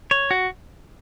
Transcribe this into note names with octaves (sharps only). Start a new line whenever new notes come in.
C#5
F#4